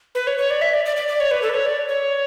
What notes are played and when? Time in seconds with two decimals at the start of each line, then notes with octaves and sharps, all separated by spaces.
0.15 B4
0.27 C#5
0.38 C#5
0.51 D5
0.61 E5
0.74 D5
0.86 D5
0.97 D5
1.08 D5
1.20 C#5
1.31 B4
1.42 A4
1.49 B4
1.54 C#5
1.66 D5
1.89 C#5